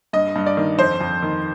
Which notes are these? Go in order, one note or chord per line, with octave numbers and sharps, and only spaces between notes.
G2 D#5
G2
D5
D#3
F2 C5
F2
D#3